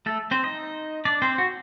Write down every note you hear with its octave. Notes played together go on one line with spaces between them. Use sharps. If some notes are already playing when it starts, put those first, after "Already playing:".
A3 A4
C4 C5
D#4 D#5
D4 D5
C4 C5
F#4